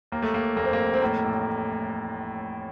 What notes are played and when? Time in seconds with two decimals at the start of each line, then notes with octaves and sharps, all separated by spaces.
0.12 D#2 A#3
0.22 A3
0.34 D#2 A#3
0.56 F1 A#3
0.65 C4
0.73 A#3
0.79 F1
0.94 C4
1.02 A2 A#3
1.24 A1